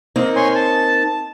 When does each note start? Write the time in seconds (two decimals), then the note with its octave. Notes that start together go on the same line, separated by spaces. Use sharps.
0.16 A#3 C4 D#4
0.36 C#5 G#5 C6
0.55 A5